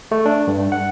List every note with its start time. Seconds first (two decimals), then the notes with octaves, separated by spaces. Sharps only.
0.11 A3
0.26 D4
0.47 G2
0.72 F#5